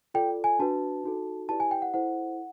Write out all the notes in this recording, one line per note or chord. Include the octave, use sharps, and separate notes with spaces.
F4 A4 D5 G5
G#5
D4 F#4 B4 A5
D#4 F#4 A4
E4 G4 B4 D5 A5
G#5
G5
F#5
E4 A4 C5 F#5